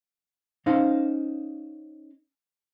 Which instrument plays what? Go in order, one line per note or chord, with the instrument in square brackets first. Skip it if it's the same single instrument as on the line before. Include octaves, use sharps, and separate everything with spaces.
[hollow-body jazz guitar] C#4 D#4 C5 F5